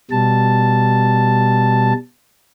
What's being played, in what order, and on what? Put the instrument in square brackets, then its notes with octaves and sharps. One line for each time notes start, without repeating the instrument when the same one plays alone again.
[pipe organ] B2 G3 A5